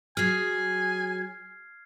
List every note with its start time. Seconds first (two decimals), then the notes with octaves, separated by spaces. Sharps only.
0.17 F#3 G#4 G#5 F6 G#6 C7